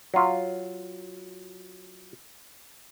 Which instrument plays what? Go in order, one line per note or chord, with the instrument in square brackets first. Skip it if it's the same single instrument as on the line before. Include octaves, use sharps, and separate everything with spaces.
[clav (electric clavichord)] F#3 F4